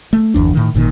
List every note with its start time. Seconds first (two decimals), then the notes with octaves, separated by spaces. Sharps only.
0.13 A3
0.34 G1 E2 D4
0.54 A2 D#3
0.75 G#1 G2 A#2 D#3